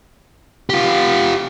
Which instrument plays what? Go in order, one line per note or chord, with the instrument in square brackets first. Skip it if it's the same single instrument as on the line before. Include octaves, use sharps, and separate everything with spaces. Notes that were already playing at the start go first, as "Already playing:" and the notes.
[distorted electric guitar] F4 G4